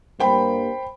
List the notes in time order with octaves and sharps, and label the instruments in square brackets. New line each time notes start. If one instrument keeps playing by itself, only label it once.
[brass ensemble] G2 G3 A#3 [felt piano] C5 G5 B5